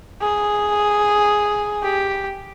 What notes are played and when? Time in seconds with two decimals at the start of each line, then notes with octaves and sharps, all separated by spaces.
0.21 G#4
1.83 G4